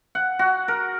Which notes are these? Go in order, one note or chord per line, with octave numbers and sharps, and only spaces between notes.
F#5
F#4
A#4